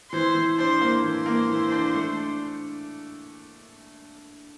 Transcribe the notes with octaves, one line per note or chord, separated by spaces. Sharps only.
E3 C5
E3
D4 C5
A#3
E3 C5
A#3
E3
D4
A3
D4